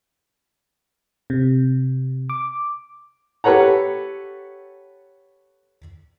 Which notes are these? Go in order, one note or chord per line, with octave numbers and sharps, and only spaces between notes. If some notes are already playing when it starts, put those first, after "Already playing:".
C3
D6
G4 A4 B4 C#5 F#5 A#5